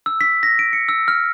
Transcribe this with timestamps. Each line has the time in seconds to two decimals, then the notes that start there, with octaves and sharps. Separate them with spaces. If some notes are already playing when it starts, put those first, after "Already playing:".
0.06 E6
0.21 B6
0.43 A#6
0.59 D7
0.73 C#7
0.89 E6
1.08 F6